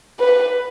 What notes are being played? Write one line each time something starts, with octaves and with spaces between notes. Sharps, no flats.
B4